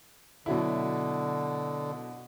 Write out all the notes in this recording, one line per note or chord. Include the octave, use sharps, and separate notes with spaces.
B2 D3 F#3 E4